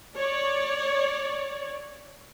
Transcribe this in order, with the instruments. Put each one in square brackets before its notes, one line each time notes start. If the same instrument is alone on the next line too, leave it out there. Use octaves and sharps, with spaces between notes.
[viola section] C#5 D5